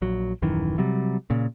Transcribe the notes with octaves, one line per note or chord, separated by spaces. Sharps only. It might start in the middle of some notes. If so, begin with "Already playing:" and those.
A#1 F#3
D#1 F#2 D#3 E3
C3 F#3 G3
A#2 C#3